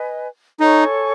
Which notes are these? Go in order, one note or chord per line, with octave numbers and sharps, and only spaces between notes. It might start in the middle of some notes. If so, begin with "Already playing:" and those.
Already playing: B4 D#5 G#5
D#4 A4 C#5 G#5 C#6